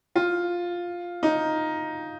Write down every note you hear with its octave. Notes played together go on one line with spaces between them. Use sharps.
F4
D#4